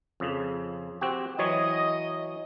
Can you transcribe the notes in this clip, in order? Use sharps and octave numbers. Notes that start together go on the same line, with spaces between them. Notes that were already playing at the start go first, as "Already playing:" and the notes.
F2 C#3
C4 F#4 G4
E3 F#3 C#5 D#5